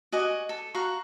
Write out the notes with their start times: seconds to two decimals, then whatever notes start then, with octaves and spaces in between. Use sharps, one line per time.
0.12 F#4 D#5 G#5 D6
0.49 A4
0.74 F#4 F5 A#5 C#6